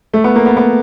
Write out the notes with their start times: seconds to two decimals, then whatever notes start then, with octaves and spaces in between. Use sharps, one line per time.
0.14 A3
0.24 B3
0.36 A#3
0.46 B3
0.57 B3